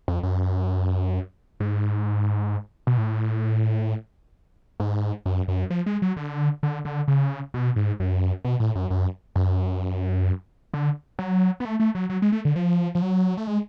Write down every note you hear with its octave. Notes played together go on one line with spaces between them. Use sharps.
F2
F#2
G#2
B2
A2
G#2
F#2
F#2
F3
G#3
F#3
D3
D3
D3
C#3
B2
G#2
F#2
B2
A2
F#2
F#2
F#2
D3
F#3
B3
A3
A3
F#3
F#3
G#3
A3
D3
F3
F3
F#3
A3
G#3